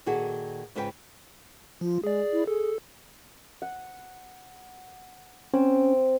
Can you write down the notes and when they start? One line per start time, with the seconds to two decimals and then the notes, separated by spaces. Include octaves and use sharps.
0.06 A#2 D#3 F#4 G#4 A4
0.75 G#2 C#3 F4 B4 C5 G5
1.81 F3 F4
2.04 G#3 G#4 D5
2.33 E4
2.47 G#4 A4
3.62 F#5
5.53 C4 C#4